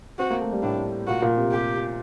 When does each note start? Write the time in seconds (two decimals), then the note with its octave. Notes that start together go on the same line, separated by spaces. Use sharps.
0.19 C4 F#4
0.30 A#3
0.41 A3
0.52 G3
0.63 A2 D4
1.07 A#2 F#4
1.22 A#2
1.37 C3
1.51 G4